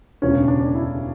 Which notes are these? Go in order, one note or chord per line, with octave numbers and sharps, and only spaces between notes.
E1 D2 C#3 E3 C#4
D4
E4